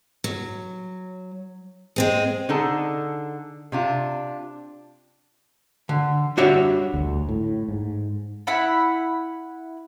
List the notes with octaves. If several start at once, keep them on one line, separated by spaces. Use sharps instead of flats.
F#3
G#3 C4 G#4
D3 D#4 G#4 A4 A5
C3 D4 F4
D3
G3 D4 F#4 C#5 E5
D2
A2
G#2
E4 F#5 B5